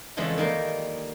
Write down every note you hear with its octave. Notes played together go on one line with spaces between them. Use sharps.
F2 C#3 E3 G#3 A3 F4
D#3 G3 A#3